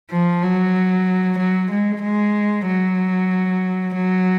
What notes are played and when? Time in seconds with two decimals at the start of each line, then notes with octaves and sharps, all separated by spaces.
0.11 F3
0.43 F#3
1.38 F#3
1.71 G#3
2.03 G#3
2.67 F#3
3.94 F#3